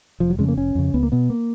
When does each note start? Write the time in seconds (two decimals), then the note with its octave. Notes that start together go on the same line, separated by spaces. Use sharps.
0.20 F1 F3
0.30 F#3
0.38 F2 C#3 G#3
0.48 A#3
0.57 F1 C#4
0.75 F2 C#3
0.94 C#2 B3
1.03 A#3
1.12 B2 B3
1.30 A#3